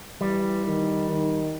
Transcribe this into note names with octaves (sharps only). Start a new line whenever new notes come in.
E3 G3
D#3
D#3